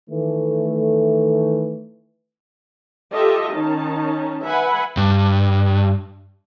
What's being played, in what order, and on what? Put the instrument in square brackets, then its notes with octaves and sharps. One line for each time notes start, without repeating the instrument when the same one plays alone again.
[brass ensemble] D#3 E3 A3
[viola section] F4 G4 A4 D#5 E5
D#3 C#4 D#4 A5
B4 E5 F#5 G#5 B5
[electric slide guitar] G2